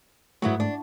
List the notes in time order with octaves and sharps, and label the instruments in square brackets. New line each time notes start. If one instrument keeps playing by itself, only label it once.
[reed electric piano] G#2 A3 [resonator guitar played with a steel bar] F#3 B3 E4
[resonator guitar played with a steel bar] D4